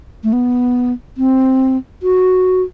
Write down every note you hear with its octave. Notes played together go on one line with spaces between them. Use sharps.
A3
B3
C4
F#4